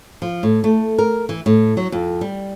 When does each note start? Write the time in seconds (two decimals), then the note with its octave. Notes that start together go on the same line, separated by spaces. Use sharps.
0.22 F3
0.43 A2
0.64 A3
0.98 A#4
1.29 E3
1.46 A2
1.77 F#3
1.92 F2
2.21 G3